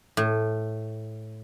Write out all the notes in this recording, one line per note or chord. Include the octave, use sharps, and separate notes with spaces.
A2